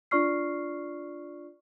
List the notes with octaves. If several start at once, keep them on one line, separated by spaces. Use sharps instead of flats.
D4 F4 D5 C#6 F6 C7